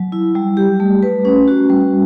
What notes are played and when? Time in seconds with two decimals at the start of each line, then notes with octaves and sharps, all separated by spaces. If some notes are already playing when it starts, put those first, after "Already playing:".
Already playing: F#3
0.12 E4
0.35 G3
0.57 G4
0.80 A3
1.03 B4
1.25 C#4
1.48 F#4
1.70 G3